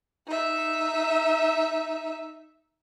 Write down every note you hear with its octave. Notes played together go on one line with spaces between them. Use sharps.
D#4 E5